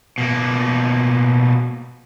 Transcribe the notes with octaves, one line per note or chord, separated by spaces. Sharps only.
B2 A#3